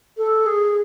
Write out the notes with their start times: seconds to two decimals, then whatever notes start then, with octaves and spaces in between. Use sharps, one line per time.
0.18 A4
0.46 G#4